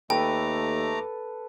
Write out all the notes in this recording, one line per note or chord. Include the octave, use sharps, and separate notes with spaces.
D#2 A3 A4 B4 G5 A#5 D6